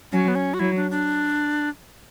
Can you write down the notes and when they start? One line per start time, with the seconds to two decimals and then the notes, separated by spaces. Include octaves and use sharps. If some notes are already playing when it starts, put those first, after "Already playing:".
0.12 F#3 C#4
0.28 B3
0.35 C#4
0.54 F#4
0.59 F#3 E4
0.76 D4
0.91 D4